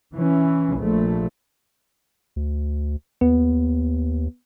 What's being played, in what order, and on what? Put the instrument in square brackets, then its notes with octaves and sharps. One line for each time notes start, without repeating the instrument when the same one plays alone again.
[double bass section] E3 C#4
A#1 A3
[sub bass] D2
[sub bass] D#2 [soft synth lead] B3